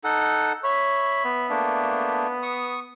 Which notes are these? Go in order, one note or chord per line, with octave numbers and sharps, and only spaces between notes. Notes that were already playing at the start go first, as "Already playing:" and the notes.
D#4 A4 F#5
C#5 E5 B5
B3
A3 A#3 D4
C#6 D#6